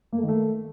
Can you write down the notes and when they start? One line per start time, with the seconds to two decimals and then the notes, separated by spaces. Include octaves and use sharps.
0.13 A#3
0.18 A3
0.23 D#3
0.28 A3